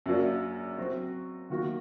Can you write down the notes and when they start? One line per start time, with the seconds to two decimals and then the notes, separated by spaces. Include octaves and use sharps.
0.06 F#2 F#3 A#3 D4
0.78 F#3 C4 F#4 C5
1.50 D#3 F#3 A#3 F#4